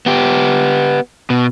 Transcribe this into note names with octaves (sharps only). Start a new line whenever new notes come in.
B3 G4
B2